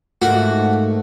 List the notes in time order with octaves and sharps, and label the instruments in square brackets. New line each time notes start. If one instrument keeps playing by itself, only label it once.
[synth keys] G#2 A3 A#3 [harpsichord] F#4